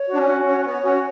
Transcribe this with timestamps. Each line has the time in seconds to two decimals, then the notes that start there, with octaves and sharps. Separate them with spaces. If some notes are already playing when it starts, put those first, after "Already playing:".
Already playing: C#5
0.08 F#4
0.14 D4
0.18 C#4
0.27 F#4
0.45 C#4 C#5
0.60 C#4
0.65 B3 C#5
0.84 C#4 F#4